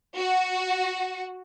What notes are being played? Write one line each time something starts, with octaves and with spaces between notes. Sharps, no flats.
F#4